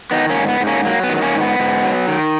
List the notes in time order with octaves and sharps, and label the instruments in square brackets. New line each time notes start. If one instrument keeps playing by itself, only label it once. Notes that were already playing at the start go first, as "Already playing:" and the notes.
[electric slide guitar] D#3 B3 D#4
A#3 C#4
G#2
B3
G#2
A#3 C#4
F#3 A#3
B3
D#3
B3
A#3 C#4
G#2
B3
G#2
F#3
D#3